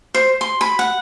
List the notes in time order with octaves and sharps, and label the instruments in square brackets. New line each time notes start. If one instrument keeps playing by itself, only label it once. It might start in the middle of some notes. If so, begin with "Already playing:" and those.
[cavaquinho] C5
C6
B5
F#5